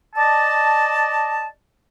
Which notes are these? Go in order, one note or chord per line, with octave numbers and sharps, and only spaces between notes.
D5 D#5 A5